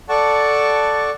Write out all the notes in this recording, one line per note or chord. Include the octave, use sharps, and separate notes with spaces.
A4 D5 F#5 A5 C#6